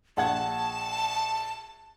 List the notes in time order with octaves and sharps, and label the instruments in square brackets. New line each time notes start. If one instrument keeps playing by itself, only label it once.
[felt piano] A#1 F#5 G#6 [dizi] A5